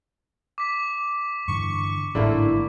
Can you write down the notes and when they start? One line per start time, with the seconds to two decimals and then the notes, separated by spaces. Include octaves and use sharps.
0.58 D6 B6
1.48 G2 D3 E3 C#6
2.15 A1 G#2 D3 A3 A#3 E4